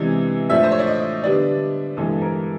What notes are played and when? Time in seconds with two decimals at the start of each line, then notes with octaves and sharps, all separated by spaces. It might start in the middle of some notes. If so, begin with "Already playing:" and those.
Already playing: C3 E3 G#3 B3 D4
0.50 A2 F3 A3 D4 E5
0.63 C5
0.71 C#5
0.79 D5
0.87 D#5
1.23 D3 G3 B3 D4 D5
1.97 G2 E3 G#3 B3 A4
2.22 A#4